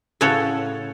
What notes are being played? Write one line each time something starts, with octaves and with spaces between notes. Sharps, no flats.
A2 C#3 F#4 A4 C#5